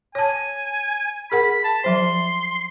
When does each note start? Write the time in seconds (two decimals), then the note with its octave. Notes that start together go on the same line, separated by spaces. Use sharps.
0.15 C#5 G#5 A5
1.32 G#4 A#4 F#5 B5
1.64 A5
1.84 F3 F#3 C5 C6